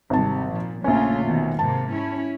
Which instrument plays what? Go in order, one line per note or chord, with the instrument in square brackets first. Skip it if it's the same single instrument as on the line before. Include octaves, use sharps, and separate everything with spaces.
[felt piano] G#1 A5 [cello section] C3 G3
[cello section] A#2 F3
[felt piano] A#1 C#4 [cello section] C#3 A3 F4
[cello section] B2 D#3
[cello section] G#2 C3 A#3 [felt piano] A5
[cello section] C#4 E4